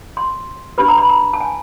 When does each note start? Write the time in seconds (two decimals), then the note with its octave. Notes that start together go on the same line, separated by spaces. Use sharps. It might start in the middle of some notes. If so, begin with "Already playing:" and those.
0.17 C6
0.78 D4 G4 B4 B5
0.88 A#5
0.98 B5
1.09 A#5
1.33 A5
1.40 G#5